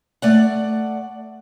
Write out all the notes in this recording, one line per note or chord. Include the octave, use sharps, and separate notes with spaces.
A3 D5 F#5